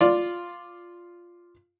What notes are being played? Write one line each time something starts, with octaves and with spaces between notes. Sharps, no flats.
F4 D5